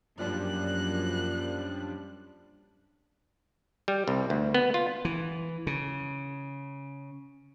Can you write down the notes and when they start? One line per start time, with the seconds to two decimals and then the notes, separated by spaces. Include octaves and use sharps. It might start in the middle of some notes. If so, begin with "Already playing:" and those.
0.19 F#2 A#2 F3 G3 D4 F#6
3.88 G3
4.08 C2
4.30 D2
4.54 B3
4.74 F4
5.05 E3
5.67 C#3